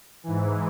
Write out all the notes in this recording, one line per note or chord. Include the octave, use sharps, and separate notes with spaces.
G#2 E3